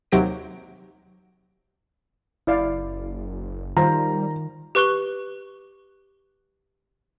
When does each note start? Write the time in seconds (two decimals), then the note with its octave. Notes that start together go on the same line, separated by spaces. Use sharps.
0.12 D#2 C3 F#3 G4 A#6 D7
2.47 F#1 E4 D5 F5
3.77 D#3 G3 F4 C5 A#5
4.75 G4 B4 C#6 F#6 G7